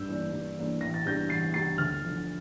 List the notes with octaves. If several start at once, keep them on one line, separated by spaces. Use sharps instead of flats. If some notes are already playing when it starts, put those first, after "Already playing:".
Already playing: G2 E6 G6
E3 A#3 D4
G2
E3 A#3 D4
A1 A#6
A6
G2 E3 G3 D4 G6 A#6
A1 A6 C7
G2 E3 G3 D4 A6 C7
D2 F6 A6
D3 F3